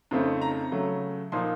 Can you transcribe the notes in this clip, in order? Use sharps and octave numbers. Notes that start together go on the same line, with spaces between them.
F2 C#3 A3 C4 D#4
A#5
C#3 F#3 A3
A#2 F3 A#3 D#4 C6